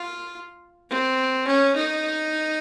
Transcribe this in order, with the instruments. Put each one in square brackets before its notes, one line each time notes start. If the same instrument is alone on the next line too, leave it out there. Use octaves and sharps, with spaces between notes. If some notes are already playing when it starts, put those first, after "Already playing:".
Already playing: [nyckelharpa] F4
C4
C#4
D#4